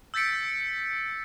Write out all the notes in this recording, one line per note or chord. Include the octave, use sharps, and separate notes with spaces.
E6 G6 A6 B6 C#7 D7